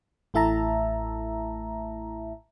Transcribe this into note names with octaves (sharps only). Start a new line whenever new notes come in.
A1 A3 E4 E5 A5 A#5